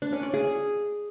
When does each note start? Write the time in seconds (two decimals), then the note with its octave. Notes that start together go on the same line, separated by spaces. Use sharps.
0.02 D4
0.13 C#4
0.23 D5
0.34 G#4